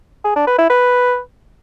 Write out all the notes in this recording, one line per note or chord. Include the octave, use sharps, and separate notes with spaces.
G#4
D4
B4
E4
B4